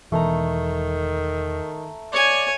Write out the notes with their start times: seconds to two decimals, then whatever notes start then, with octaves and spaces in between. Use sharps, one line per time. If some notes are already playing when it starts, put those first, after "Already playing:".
0.12 E1 E2 D#3 E3 A3 A#5
2.13 C#5 D5 G#5